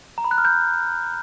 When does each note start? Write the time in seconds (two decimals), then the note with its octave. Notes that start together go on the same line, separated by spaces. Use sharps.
0.18 A#5
0.24 B5
0.31 F#6
0.38 F6
0.45 G6